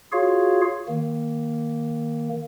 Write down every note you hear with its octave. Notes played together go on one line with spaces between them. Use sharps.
F4 F#4 G#4 C#5 F5
D#3 A#3